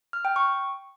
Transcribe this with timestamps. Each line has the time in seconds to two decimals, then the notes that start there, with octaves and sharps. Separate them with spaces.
0.13 F6
0.25 G5
0.36 C#6